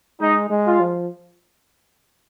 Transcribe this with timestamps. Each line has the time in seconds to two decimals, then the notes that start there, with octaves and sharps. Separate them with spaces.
0.20 G#3 D#4
0.50 G#3
0.65 F4
0.80 F3